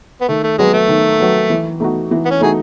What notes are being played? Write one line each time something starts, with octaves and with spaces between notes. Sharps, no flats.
B3
D#3 A3
A3
F#3 G#3 B3
A3
D#3
F#3 B3
E3
A3 D#4 F#4
E3
B3
C#4
A3 D#4 F#4 G#4